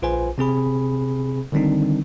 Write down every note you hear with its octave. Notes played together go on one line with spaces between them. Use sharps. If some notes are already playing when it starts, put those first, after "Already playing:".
A#1 F4 B4 C5 G#5
C3 C4 G#4 B5
D3 D#3 G3 C4 D4 D#4